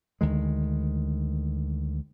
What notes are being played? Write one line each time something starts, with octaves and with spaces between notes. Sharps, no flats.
D2 D#3 G#3